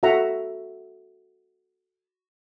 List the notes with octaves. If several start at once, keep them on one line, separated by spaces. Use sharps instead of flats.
F#4 A4 E5 F#5 A#5